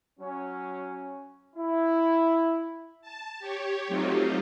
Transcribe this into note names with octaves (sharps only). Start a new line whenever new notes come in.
F#3 C#4
E4
A5
G4 C#5
F#3 A3 C4 D#4 F4 G4